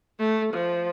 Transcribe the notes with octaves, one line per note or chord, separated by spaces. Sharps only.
A3
F3